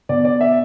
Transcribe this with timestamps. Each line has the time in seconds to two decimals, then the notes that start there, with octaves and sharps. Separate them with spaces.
0.09 B2 D5
0.25 D5
0.41 E5